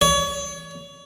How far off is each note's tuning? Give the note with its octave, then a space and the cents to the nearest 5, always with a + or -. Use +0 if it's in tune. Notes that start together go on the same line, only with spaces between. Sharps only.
C#5 +30